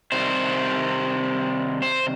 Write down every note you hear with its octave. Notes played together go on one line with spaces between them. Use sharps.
C3 D#3 G3 C5
C5